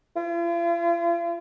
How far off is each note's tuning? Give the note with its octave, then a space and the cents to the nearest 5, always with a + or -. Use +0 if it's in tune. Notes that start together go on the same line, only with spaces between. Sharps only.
F4 -45